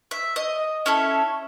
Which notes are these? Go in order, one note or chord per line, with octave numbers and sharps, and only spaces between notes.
E5
D#5
C#4 E4 A4 C#5